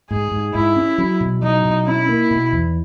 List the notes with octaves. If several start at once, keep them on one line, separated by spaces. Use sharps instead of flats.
G#2 G#4
G#2
G#2 E4
C#4
F#3
B2
F#3 D#4
B2
C#4 E4
A#3
B2
E2